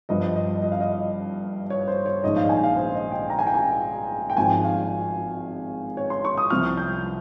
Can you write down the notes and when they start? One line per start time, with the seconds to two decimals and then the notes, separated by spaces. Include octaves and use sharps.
0.09 G1 G2 F3 D#5
0.36 D#5
0.62 D#5
0.72 F5
0.80 D#5
1.70 C#5
1.88 C5
2.06 C#5
2.24 A#1 G#2 D#3 D#5
2.36 F5
2.49 G#5
2.63 F5
2.77 C5
2.95 D#5
3.12 G5
3.30 A#5
3.39 G#5
3.47 G5
3.54 G#5
4.30 G5
4.37 G#1 G#2 F3 G#5
4.64 F5
5.97 C#5
6.10 C6
6.25 C#6
6.37 D#6
6.50 C2 C3 F3 F6
6.77 G6